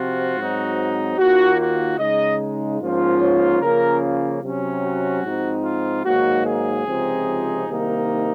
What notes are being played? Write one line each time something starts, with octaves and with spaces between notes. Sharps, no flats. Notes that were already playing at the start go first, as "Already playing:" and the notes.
Already playing: C3 F3 C4 F4 F#4
G#2 F#3 C4 D#4
D#2 D#3 A#3 F4 F#4
F#4
C#3 G#3 D#4 D#5
G#2 F3 A#3 C#4 F4
C#5
C#3 F3 A#3 C#4 F4 A#4
C3 F#3 C#4
F#4
G#2 F3 C4 D#4
F4
G#2 D#3 F#3 A#3 D#4 F#4
G#4
C#2 C3 F3 C4 D#4
C2 C3 D#3 A#3 D#4